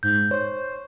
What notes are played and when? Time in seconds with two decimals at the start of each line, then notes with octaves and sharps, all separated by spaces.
0.03 G#2 G6
0.31 C5 C#5